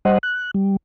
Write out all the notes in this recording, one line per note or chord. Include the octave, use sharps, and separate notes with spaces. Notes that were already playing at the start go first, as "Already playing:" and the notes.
G3 C5 D#5 F#5
F#6
G3